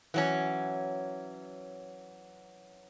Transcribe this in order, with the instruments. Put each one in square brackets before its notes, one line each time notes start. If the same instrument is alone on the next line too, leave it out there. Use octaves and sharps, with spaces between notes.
[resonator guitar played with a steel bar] E3 F#3 C#4